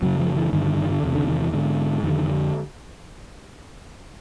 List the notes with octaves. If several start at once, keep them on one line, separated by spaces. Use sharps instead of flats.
F#2 C#3 F#3
F3
E3
G2 D3 D#3
D#3
D#3
D3
E2 C3
D3
D#3
E3
G#2 D3
F2 D3 D#3
D3